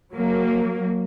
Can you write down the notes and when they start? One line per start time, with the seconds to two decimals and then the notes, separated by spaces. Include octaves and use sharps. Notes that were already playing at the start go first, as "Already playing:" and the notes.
0.13 F#3 A#3